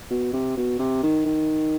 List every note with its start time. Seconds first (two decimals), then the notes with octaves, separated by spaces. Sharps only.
0.11 B2
0.33 C3
0.57 B2
0.79 C3
1.03 D#3
1.26 D#3